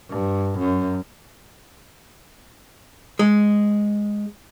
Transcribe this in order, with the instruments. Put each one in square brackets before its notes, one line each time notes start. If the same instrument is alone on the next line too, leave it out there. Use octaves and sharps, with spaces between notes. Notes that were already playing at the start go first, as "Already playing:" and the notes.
[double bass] G2
F#2
[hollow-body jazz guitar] G#3